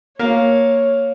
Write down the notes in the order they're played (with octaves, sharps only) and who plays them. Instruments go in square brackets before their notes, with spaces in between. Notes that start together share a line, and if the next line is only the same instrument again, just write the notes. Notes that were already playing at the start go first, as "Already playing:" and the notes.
[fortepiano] A#3 F5 [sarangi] C#5